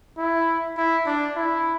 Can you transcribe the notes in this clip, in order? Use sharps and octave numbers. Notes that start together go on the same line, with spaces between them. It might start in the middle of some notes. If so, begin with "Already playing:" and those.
E4
E4
D4
E4